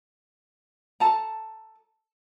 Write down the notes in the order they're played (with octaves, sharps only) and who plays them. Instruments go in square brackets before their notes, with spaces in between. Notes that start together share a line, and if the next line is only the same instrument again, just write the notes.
[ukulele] A4 A5 A#5